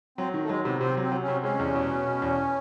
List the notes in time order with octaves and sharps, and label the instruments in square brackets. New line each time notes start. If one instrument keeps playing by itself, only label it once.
[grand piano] F#3 [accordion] C4
[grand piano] D#3
[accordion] A3
[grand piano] F#3 [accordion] G#3
[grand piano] C3 [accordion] B3
[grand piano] C3 [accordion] C4
[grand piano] F#3 [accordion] C4
[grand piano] F#3
[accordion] C#4
[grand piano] C3
[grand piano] G#3 [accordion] C#4
[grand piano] E2
B2
B2
B2
E2